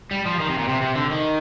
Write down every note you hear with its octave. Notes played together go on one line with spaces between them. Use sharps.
G3
F3
D#3
C3
A#2
C3
C3
D3
D#3